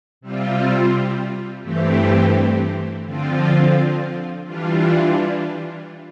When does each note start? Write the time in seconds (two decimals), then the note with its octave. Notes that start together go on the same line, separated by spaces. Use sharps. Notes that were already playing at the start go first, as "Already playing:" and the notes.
0.21 C3 G3 C4 F4
1.63 G2 E3 A3 C4 G4
3.04 D3 F3 C4 F4
4.46 E3 G3 D4 F4